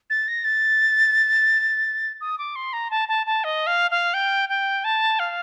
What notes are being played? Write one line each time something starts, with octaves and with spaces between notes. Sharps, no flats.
A6
A#6
A6
D#6
D6
C6
A#5
A5
A5
A5
D#5
F5
F5
G5
G5
A5
F5